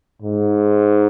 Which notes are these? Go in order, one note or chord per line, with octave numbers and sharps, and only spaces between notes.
G#2